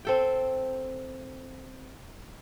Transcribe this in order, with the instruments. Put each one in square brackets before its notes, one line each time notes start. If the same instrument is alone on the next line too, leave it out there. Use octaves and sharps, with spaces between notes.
[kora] C4 A4 G5